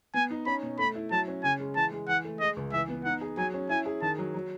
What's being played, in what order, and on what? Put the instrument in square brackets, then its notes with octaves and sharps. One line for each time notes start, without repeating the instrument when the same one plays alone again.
[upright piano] B3 [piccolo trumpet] G#5
[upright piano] D#4
[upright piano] C#4 [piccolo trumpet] B5
[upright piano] B2
[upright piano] A3 [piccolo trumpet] B5
[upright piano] E4
[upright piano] F#3 [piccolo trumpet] A5
[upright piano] C#4
[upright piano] C#3 [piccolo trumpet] G#5
[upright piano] G#3
[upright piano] E3 [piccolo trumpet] A5
[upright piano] G#3
[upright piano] E3 [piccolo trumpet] F#5
[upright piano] A3
[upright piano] G#3 [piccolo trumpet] D#5
[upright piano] C#2
[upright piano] E3 [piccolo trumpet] E5
[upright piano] B3
[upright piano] D#4 [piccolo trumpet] F#5
[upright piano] G#4
[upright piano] F#3 [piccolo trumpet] G#5
[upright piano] C#4
[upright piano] E4 [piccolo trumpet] G#5
[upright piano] G#4
[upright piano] D#3 [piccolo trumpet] A5
[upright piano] F#3
F#3